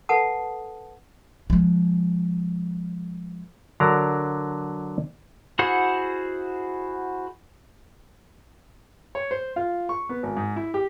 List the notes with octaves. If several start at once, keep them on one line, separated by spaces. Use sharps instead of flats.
A4 B4 F#5 A5 D#6
F3 G#3
D3 F#3 D4 A#4 A#5
E4 F#4 G#4 C5 F#5
C#5
C5
F4
C#6
B3
G#1
G#2
E4
G4